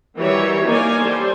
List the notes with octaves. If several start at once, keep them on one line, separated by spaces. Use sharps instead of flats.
D#3 E3 F#3 G3 C#5 E5
A#3 D#4 A#4 C#5 D5 G#5
G3 A4 C5